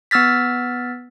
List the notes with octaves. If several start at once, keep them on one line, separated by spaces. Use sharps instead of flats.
B3 E6 F6 A6 B6